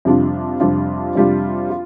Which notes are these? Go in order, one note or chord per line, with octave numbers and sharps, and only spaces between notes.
F2 C3 G3 D4 F4
F2 C3 G3 D4 F4
F2 C3 G3 D4 F4
F4